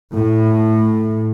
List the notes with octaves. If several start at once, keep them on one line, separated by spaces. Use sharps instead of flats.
A2